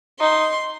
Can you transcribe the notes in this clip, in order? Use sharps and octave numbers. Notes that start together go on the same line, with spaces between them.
D#4 C6